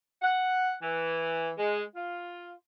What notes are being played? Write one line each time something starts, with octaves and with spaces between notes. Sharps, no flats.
F#5
E3
G#3
F4